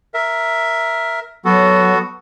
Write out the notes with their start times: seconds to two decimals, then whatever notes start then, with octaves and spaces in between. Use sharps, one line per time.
0.14 A#4 E5
1.45 F#3 B3 F#4 A4